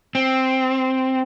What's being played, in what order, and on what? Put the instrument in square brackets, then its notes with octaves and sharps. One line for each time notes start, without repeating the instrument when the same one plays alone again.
[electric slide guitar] C4